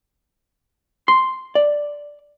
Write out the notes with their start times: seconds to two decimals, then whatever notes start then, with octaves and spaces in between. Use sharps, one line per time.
1.08 C6
1.55 D5